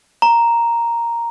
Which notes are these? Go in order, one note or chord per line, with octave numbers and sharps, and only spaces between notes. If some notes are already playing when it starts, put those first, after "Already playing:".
A#5